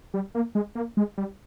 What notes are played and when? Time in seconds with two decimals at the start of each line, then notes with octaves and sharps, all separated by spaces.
0.14 G3
0.35 A#3
0.55 G#3
0.75 A#3
0.97 G#3
1.18 G3